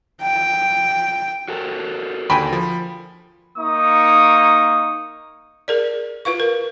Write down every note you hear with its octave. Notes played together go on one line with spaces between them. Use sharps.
G5
F#4 A4 A#4
D#2 D3 G5 G#5 B5
F3
A#3 D#4 C#6 D#6
G#4 A#4 D5
F4 B4 F5 C#6
A#4